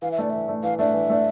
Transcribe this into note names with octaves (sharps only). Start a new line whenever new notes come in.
E3 F5
E5
A3 D4 D5
E3 E5
A3 D4
E3 F5
A3 D4 E5
E3
A3 D4